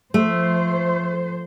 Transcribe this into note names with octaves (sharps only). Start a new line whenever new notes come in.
F3 A3 C5